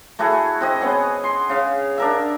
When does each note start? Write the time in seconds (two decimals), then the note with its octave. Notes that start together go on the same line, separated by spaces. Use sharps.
0.19 A3 E4 F#4 G#4
0.61 C4 F#4 D#5
0.81 B3 C#4 G#4
1.24 C6
1.49 C#3 F5
1.98 D4 A#4 E5